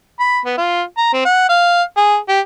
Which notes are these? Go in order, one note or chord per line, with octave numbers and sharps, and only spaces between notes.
B5
B3
F4
A#5
C4
F#5
F5
G#4
G4